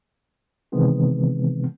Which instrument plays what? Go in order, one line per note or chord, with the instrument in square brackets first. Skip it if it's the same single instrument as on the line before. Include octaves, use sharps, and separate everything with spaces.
[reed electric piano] C3 D#3 E3 G#3 B3 C4